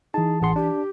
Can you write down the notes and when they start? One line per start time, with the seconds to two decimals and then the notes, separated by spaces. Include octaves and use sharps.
0.14 E3 D#4 G#4 A5
0.42 A1 G#4 F#5 C6
0.56 D4 G4